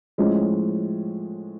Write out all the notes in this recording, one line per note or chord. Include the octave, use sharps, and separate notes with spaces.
A2 F3 G#3 C#4